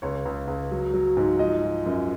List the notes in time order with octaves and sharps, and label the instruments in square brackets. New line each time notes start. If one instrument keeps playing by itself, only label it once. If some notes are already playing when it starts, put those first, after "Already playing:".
[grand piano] C#2 C#5
C#2
C#2
F#3
F#3
G#2
F3 D#5
F3
F#2